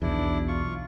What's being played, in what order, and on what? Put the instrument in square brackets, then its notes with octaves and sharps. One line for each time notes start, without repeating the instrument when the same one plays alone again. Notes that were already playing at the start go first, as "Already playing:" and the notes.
[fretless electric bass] B1 E2 [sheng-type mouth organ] D4 E4
[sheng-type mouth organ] F4 C#6